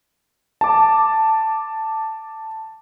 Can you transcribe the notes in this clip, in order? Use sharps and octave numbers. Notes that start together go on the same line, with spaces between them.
A5 D6